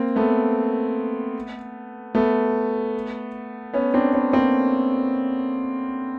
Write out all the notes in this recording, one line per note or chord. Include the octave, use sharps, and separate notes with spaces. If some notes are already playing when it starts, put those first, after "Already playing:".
Already playing: A#3 C4
A3 B3
A3 B3
B3 C#4
C4 D4
B3 C#4
A#3 C4